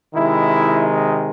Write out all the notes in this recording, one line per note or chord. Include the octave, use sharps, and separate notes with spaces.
C3 D#3 G#3 E4